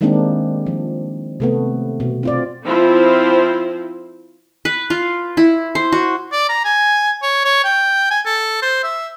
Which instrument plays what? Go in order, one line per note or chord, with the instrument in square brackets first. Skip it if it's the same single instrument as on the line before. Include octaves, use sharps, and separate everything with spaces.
[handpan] D#3 G3 G#3 A#3 C4 D4
F3
C3 A3 B3
B2
C4 F4 D5
[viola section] F3 C4 E4 F4 C5
[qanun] B4
F4
E4
C5
F#4
[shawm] D5
A#5
G#5
C#5
C#5
G5
G#5
A4
C5
E5